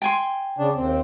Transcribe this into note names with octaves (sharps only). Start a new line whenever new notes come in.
G5 G#5 C6
C#3 D4
D#2 C4